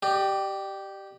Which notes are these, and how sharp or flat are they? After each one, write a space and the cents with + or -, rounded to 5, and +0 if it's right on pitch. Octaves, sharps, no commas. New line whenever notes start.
G4 -10 D5 +40